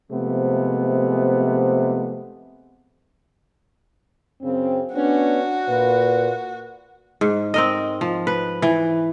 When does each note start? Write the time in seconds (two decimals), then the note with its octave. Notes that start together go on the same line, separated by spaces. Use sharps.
0.11 C3 F3 G#3 A3 B3
4.42 F#2 C#3 C4
4.94 B3 C#4 D4 F#4
5.68 A#2 B4
7.21 G#2
7.54 C4 A#4 D#5
8.01 F3
8.27 B4
8.62 E3